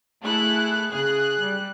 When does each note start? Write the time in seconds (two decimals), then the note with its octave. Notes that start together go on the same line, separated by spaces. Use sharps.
0.24 A3 E4 G#4 A4 F#6
0.92 C#3 G#4 F#6
1.39 G3